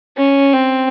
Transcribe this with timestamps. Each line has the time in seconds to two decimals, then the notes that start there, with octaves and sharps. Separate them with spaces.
0.17 C#4
0.53 C4